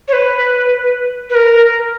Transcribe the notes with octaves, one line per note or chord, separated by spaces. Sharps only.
C#5
B4
B4
A#4